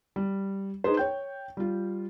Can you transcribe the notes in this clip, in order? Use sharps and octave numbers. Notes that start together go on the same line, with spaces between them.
G3
D#4 G#4 B4 C5
C#5 G5 G6
G3 F4